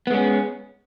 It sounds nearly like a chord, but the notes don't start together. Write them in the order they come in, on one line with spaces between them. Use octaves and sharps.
B3 G#3 C#4